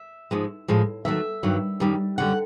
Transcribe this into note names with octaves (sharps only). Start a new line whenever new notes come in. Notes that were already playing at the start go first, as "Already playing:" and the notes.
Already playing: E5
G#2 F3 G#3
A2 F3 G#3
D#2 D#3 F#3 A3 E5
G2 D#3 F#3
F#2 D#3 G3
F#2 D3 G3 F#5